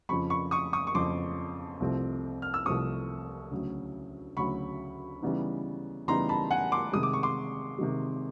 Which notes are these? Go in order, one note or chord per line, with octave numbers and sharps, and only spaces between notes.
F2 C#3 F3 B5 C#6
B5 C#6
C#6 D#6
C#6 D#6
C#6
F2 C#3 F3 C6 D6
C2 C3 F3 A3 C4
F6
E6
C2 C3 F3 A3 C4 C#6 D#6
D2 C#3 F#3
D2 C#3 F#3 B5 C#6
C#3 E3 G3 B3 D#4
C#3 E3 G3 B3 D#4 A#5 C6
A5 B5
F#5 G#5
C6 D6
C3 D#3 G#3 D#6
D6
C#6
C6 D6
C3 D#3 G#3